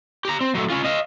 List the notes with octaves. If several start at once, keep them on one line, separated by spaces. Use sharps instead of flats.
G4 A#5
C4
F#3 A3
C#4 F4
D#5 F5